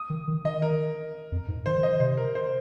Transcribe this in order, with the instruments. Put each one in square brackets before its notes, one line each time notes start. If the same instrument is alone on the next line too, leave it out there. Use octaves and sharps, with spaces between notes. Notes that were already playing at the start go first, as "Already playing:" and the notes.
Already playing: [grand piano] D#6
[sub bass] D#3
D#3
[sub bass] D#3 [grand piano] D#5
[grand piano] A#4
[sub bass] F2
G#2
[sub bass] D#3 [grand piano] C5
[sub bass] D#3
[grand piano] D#5
[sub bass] D#3
[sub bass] C3 [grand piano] C5
[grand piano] A#4
C5